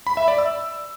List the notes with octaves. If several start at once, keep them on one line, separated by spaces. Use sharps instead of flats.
B5
E5
D5
E6